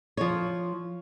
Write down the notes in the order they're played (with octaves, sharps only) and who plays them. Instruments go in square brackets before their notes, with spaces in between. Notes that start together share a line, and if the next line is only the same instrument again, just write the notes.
[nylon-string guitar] F3 C#5